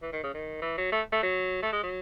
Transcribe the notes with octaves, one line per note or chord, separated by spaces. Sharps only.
E3
D#3
C#3
D#3
E3
F#3
A3
A3
F#3
A3
G#3
F#3